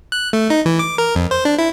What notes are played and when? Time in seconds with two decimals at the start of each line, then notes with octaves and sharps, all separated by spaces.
0.12 F#6
0.33 A3
0.50 D#4
0.66 E3
0.79 D6
0.98 A#4
1.15 F2
1.31 C5
1.45 D4
1.59 E4